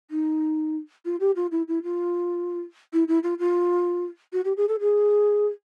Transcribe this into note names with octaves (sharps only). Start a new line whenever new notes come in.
D#4
F4
G4
F4
E4
E4
F4
E4
E4
F4
F4
F#4
G4
G#4
A4
G#4